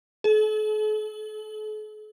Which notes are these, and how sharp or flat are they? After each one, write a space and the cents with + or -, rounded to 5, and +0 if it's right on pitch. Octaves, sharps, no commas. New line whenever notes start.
A4 -45